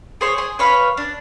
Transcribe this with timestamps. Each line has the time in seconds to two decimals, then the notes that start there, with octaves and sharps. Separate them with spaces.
0.21 G#4 C5 C#5
0.38 G#4
0.59 B4 C#5 F5 B5
0.97 D4